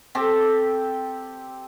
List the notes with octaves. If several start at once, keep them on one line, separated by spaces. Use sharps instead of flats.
C4 G4 A4